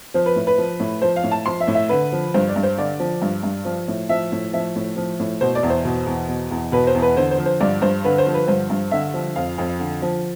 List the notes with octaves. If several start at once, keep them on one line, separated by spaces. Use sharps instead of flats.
F3 C5
B4
A2
B4
F3
A2
F3 C5
F5
A2
A5
F3 C6
E5
A2
E5
D3 B4
F3
G2 C5
D5
G2
C5
D3 D5
F3
G2
G2
F3
A2
F3 E5
A2
F3 E5
A2
F3
A2
B2 C5
D5
E2
C5
B2
E2
B2
E2
B2 B4
C5
E2
B4
D3 C5
C5
F3
C5
G2 D5
G2 C5
D3 B4
C5
F3
B4
G2 C5
G2
D3 E5
F3
F2 F5
F2
D3
F3